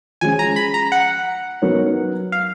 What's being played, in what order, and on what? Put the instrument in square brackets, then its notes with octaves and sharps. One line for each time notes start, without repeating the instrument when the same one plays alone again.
[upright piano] F3 G#3 C#4 [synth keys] G#5
[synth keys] A#5
B5
A#5
F#5
[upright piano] F#3 B3 D#4 A#4 C#5
[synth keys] F5